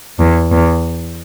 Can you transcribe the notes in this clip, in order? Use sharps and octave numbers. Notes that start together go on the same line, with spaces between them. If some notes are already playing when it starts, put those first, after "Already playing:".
E2
E2